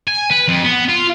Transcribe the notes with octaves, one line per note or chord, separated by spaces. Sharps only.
G#5
B4
F2
B3
F4